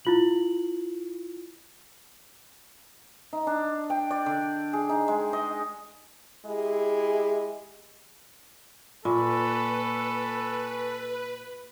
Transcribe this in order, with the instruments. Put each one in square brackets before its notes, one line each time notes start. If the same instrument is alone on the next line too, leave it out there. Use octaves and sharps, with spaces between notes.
[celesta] E4 F4 F#7
[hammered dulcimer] D#4
D4
G5
D5
D3
G#4
D#4
G#3
D#5
[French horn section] G#3 E4 G4 G#4
[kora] A#2 [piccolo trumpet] A4 [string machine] B4 [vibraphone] G#5 B5 C#6